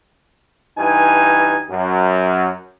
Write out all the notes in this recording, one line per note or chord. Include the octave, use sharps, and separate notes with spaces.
G2 E3 D#4 G#5
F#2